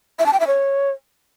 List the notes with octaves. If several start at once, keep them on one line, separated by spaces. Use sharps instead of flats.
E5
A5
G5
E5
C#5